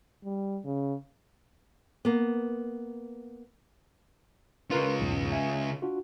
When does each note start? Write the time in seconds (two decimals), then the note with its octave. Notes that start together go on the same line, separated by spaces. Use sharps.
0.24 G3
0.65 C#3
2.05 A#3 B3
4.71 C#3 F4 A#4 B4 C6
5.00 B1 E2 G#2
5.32 E5 G#5
5.82 D4 F4 F#4